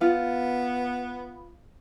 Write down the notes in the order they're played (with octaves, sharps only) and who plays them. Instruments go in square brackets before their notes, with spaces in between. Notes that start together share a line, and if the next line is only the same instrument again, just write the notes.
[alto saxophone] B3 [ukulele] F4